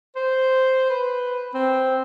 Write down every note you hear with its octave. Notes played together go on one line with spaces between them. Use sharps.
C5
B4
C4